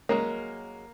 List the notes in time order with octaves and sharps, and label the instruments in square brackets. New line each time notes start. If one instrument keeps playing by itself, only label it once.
[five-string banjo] F#3 G#3 C#4 [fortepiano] A#3